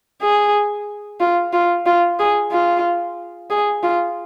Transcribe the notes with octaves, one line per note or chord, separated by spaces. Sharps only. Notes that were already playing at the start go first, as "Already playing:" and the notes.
G#4
F4
F4
F4
G#4
F4
G#4
F4